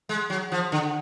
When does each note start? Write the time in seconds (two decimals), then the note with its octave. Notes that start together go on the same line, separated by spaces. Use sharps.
0.09 G#3
0.30 F#3
0.52 F3
0.72 D3